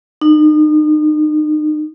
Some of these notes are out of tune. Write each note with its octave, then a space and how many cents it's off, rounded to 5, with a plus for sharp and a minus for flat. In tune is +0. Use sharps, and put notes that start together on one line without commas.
D#4 -35